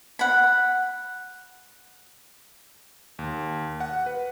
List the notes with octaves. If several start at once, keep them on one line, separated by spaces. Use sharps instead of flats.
F#5 B5
D#2
F#5
B4